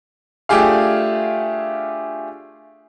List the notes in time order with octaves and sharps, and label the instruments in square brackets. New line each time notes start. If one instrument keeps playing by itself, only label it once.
[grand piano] A3 D4 F4 G4 G#4 F5